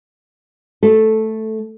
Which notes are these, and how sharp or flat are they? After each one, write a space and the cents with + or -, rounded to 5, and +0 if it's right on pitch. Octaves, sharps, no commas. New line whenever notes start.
A3 -5 A4 -5